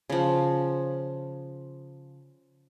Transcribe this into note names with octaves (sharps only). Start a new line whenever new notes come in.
C#3 F3